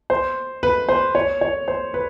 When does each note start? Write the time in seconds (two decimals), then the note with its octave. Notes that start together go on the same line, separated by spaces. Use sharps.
0.10 C5
0.63 B4
0.89 C5
1.15 C#5
1.41 C#5
1.68 C5
1.94 B4